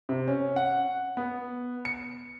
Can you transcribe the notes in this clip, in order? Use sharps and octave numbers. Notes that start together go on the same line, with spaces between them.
C3
C#4
F#5
B3
C#7